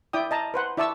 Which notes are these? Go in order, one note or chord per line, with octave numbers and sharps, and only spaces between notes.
E4 D5 G5 D#6
D#5 A5 A#5
B4 C5 F#5
E4 D5 E5 A5 C#6 E6